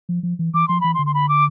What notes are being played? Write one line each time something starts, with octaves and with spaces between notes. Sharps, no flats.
F3
F3
E3
E3 D6
F3 C6
E3 B5
C6
D3
C6
B5
D6